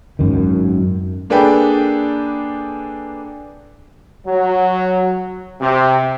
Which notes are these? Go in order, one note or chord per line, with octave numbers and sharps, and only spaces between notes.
G#1 F#2 D#3
A#3 D4 G#4 A4 B4 G5
F#3
C3